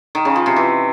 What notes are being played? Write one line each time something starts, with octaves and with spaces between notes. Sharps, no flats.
D#3
C#3
F3
C3
E3